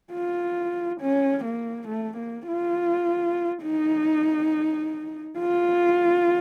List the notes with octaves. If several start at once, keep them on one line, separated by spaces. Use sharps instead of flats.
F4
C#4
A#3
A3
A#3
F4
D#4
F4